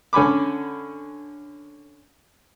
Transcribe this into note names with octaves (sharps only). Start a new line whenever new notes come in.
D3 C#4 G#5 B5 D6